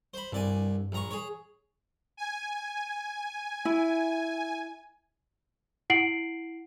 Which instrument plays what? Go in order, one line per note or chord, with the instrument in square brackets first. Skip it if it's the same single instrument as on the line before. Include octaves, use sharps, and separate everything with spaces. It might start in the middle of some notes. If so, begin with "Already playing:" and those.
[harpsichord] C5 B5
[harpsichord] C2 D5 G#5 [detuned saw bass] G2
[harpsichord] A#1 A#5 C#6
G#4 C#5
[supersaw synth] G#5
[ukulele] E4
[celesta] E4 F#5 C7 D7 F#7